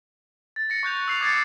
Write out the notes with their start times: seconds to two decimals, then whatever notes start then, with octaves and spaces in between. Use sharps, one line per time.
0.56 A6
0.70 A#6 C#7
0.83 C#6 F#6 G6 F7
1.08 E6 C7 F7
1.21 D6 D#6 G#6 A6 C7 C#7